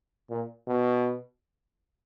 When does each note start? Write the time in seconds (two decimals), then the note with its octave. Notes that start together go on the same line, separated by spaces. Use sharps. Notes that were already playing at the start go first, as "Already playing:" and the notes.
0.30 A#2
0.67 B2